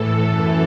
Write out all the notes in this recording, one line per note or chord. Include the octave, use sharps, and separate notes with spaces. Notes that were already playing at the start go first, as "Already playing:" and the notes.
Already playing: A2 E3 A4
F#2 E3